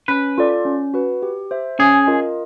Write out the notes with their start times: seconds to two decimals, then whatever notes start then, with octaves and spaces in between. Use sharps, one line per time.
0.08 C#4 B4
0.38 F4 A4 D5
0.65 C#4
0.94 F#4 B4
1.23 G4
1.51 C5 E5
1.79 C#4 G#4
2.07 F4 A#4 D#5